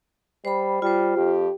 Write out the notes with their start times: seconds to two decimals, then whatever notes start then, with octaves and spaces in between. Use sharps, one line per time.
0.45 G3 C5 B5
0.82 G3 F4 C5
1.17 F2 G4